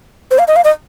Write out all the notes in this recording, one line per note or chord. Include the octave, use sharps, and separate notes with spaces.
C5
F5
D#5
F5
D#5